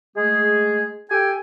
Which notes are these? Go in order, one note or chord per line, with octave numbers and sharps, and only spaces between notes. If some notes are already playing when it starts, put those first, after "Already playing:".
G#3 A3 G#4
G4 A4 G5 G#5